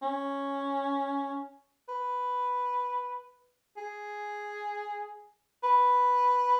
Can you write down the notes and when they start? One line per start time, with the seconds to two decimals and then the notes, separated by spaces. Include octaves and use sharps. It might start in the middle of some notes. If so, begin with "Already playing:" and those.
0.02 C#4
1.89 B4
3.77 G#4
5.64 B4